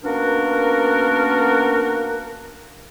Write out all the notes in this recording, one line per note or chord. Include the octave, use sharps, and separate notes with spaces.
A#3 B3 C#4 D4 F#4 A#4